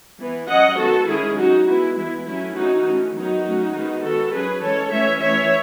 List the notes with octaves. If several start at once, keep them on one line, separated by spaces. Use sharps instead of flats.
E3 B3
F#3 C#4 D#5 F#5
D#3 G#3 B3 F#4 A4
D#3 G#3 C#4 E4 G#4
F#3 C#4 D#4 F#4
E3 G#3 B3 E4
E3 G#3 B3 E4
F#3 A3 C#4 E4
E3 A3 C#4 D#4 F#4
E3 A3 C#4
D#3 F#3 B3 D#4 F#4
F#3 A3 C#4
D#3 G#3 B3
D#3 G#3 B3 F#4 A4
F#3 C#4 G#4 B4
E3 G#3 C#4 A4 C#5
E3 A3 C#4 C#5 E5
E3 A3 C#4 C#5 E5